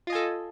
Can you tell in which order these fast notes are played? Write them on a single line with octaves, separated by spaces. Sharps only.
F4 D#5 G#5 A4